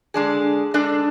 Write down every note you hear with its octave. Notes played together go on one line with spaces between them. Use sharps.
D3 G#3 D4 G#4
G#3 D4 A4